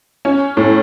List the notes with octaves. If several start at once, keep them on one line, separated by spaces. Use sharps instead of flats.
C#4
A2